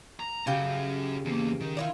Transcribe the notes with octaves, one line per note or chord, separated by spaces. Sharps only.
A#5
C#3 C#4 F#4 G4 G5
E2 A#3
D#3
D4 E4 F4